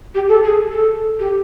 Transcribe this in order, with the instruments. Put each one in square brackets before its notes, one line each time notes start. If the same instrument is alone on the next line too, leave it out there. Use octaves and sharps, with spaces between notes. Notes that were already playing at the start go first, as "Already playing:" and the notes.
[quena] G4
A4
G#4
A4
G4